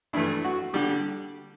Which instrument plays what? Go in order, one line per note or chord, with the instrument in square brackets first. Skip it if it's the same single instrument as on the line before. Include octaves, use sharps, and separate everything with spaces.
[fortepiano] G2 E4
E3 A3
F#4
D3 G3 G4